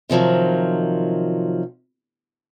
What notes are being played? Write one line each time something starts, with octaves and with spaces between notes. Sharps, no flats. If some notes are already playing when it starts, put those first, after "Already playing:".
C3 D#3 F3 F#3